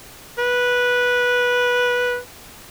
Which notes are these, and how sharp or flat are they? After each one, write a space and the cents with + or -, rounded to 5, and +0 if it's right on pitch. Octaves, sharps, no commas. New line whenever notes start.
B4 -10